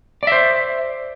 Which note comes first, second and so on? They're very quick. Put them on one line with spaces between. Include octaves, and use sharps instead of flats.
D5 E5 C5